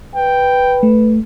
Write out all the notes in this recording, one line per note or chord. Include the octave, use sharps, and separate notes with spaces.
B4 G5
A3